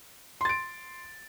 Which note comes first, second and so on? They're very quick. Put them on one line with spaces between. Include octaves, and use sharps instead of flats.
C6 A6 D7